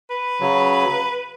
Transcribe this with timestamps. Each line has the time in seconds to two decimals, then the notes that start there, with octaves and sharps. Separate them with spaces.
0.11 B4
0.40 C#3 F#3